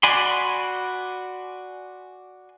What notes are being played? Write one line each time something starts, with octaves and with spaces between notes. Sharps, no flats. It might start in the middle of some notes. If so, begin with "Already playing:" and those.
F#4 D5 G#5 B5 C6